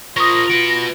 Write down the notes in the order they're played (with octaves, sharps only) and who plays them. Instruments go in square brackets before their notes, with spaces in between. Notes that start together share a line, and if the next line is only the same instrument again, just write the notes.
[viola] F4 [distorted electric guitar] A#4 C5 [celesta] C#6 D#6 [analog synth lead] A#6
[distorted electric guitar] F#4 B4 [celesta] D7